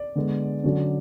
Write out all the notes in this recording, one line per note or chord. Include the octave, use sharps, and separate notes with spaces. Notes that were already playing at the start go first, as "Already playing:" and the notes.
Already playing: D5
D3 G#3 B3
D3 F#3 C#4